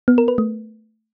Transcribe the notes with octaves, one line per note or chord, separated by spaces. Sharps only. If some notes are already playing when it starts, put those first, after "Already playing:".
B3
A#4
B4
A3